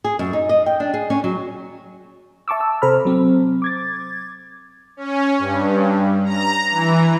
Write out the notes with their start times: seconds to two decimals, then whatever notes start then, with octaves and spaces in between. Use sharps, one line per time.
0.04 G#4
0.19 F#2
0.33 D#4
0.49 D#5
0.66 G5
0.80 D4
0.94 G#4
1.10 C#4
1.24 F#3
2.48 E5 A5 C#6 D6 E6
2.60 A5 E6
2.82 C3 A4 C5 A#5 B5 F6
3.05 F#3 C4
3.62 D6 G#6 A6
4.97 C#4
5.38 G2
6.25 A#5
6.70 E3